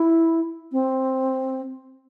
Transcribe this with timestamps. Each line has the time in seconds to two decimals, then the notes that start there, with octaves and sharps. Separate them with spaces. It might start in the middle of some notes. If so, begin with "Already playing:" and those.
Already playing: E4
0.72 C4